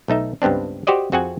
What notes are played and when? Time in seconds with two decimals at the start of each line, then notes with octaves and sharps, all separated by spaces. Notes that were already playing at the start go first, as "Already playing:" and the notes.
0.08 B1 A3 D#4 E5
0.42 C#2 G2 B3 C4 D4
0.87 F#4 G4 C5 D5 D#5
1.12 F2 C4 F#4 G#4 F#5 G#5